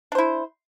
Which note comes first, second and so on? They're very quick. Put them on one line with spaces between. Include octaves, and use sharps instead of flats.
D4 C5 E4